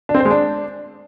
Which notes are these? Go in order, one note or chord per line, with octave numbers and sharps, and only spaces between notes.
D4
C4
C5
G#3
D4